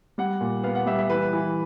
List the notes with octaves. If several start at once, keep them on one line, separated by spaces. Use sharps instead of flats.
G3 F#5
A#2
B3 F5
F#5
G3 E5
E5
E3 B4
E3